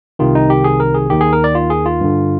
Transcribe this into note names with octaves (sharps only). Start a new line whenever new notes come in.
C2 C3 D#3 F4
D#4
G4
G#4
A#4
G#4
D#2 D#3 G4
G#4
A#4
D5
F4
G#4
F4
G2 D3